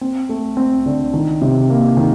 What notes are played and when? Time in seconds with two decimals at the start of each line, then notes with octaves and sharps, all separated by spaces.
0.01 C4
0.29 A3
0.57 C4
0.86 D3
1.14 D#3
1.42 C3
1.70 A#3
1.97 D#3